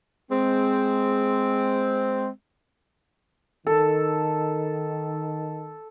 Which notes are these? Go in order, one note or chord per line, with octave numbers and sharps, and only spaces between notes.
G#3 C4
D#3 A4